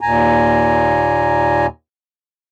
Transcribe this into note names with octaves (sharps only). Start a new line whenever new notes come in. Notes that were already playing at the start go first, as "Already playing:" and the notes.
D#2 A#2 G#5 A#5